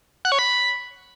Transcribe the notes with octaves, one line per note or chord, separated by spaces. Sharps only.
F#5
C#5
B5